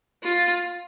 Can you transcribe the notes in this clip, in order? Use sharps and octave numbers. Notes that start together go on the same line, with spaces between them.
F4